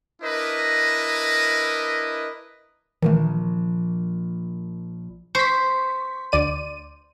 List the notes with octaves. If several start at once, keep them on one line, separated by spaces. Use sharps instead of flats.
D4 E4 A#4 B4 D#5
A#1 A#2 D#3 E3 A3
C5 C#6 B6
D2 D5 D#7